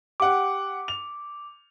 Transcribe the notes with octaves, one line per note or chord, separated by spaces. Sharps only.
G4 F#5 D6
F7